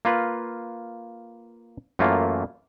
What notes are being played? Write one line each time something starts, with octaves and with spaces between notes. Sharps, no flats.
A#3 F4 B4
F#2 E3 A3 A#3 F4